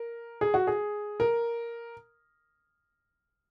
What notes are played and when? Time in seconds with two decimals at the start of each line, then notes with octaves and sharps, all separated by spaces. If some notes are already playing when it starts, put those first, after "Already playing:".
Already playing: A#4
0.41 G#4
0.54 F#4
0.67 G#4
1.20 A#4